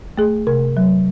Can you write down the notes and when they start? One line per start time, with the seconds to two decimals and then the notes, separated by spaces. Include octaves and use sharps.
0.18 A3 G#4
0.47 C3 A#4
0.77 F#3